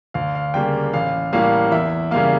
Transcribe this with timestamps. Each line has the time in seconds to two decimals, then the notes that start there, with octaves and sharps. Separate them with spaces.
0.14 D2 F5
0.35 F5
0.54 C#3 G3 A#3 G5
0.93 A1 F5
1.33 A2 G3 A#3 F5
1.72 E2 E5
2.11 C#3 G3 A#3 F5